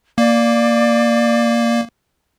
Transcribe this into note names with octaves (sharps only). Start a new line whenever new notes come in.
A#3 D5